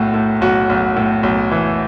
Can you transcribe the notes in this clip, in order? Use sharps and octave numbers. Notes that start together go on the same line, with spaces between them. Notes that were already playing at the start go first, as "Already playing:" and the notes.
Already playing: B1 A2 F#4
A2
B1 F#4
B1
A2
B1
E3